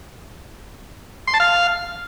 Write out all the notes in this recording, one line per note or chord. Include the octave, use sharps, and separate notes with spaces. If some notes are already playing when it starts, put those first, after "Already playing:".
C6
A5
F5